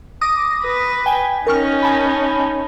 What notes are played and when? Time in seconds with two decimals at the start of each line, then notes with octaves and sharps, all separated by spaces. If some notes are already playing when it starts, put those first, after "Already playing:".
0.21 D6 D#6 A#6
0.64 B4
1.06 G5 G#5
1.47 C#4 D#4 A#4 C#6 F6
1.83 G#5 A5 B5